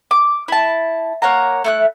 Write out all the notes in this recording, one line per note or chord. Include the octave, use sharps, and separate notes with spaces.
D6
E4 A5
A#3 C#5 F#5 A#5
A3 E4 F#6